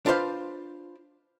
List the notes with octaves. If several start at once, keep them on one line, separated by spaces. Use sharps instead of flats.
D4 F4 B4 C5 F5